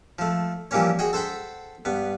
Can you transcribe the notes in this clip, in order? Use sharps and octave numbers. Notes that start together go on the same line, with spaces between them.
F3 A3
E3 F3 G3 A#3 C#4 C#5
F#4 G#4 D#5 F#5 G5
A4 C5 F#5 G5 B5
G2 B3